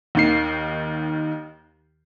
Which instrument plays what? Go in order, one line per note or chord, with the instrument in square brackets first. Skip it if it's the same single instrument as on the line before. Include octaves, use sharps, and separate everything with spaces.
[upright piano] D#2 D#3 C7